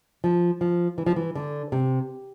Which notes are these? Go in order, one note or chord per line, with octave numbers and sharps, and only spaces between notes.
F3
F3
E3
F3
E3
D3
C3